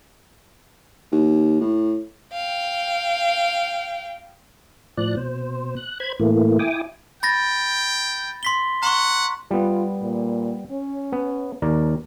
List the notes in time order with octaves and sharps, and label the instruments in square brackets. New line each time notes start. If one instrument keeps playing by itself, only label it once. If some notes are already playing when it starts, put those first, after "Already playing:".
[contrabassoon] D#2
A2
[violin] F5 G5
[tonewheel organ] A2 F3 D5 F#6
B2 C5
F#6
C5 B5 G#6
A2 E3 A3 A#3
E4 G5 G#5 D6 D#6
[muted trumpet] G5 [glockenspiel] B5 A6 A#6
[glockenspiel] C6 B6 G7
[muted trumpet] F#5 [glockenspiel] A#5 C6 C#6
[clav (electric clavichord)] G3 B3 [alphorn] F4
[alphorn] A#2
C#4
[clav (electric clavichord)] B3
D#2 A#4 D5